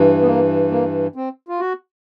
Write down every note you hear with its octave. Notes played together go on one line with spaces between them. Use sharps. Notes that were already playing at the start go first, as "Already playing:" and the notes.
Already playing: G2 E3
B3
A#3
A#3
C4
F4
F#4